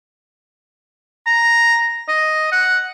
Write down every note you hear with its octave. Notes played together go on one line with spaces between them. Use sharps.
A#5
D#5
F#5